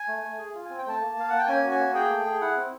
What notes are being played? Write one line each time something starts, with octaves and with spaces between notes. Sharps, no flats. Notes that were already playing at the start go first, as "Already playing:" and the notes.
Already playing: G#5
A3
A3
G#4
F4
C4 G#5
G5
A3 A5
A#3
A#3 F5
A#3 F#5
G5
C#4 G#5
F#4
G#5
A#3
G#4 G5
A3
G#4
E4 F#5
C4